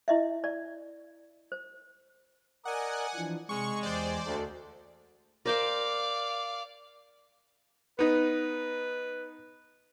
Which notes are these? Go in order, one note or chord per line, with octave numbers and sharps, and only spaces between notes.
E4 D#5 E5
D5
C5
A#4 D5 D#5 F#5 G#5
E3 F3 D4
C3 G#3 C#6
E2 G4 C5 D5
D2 A4
A#4 C5 D5 F5 G5
B3 D#4 B4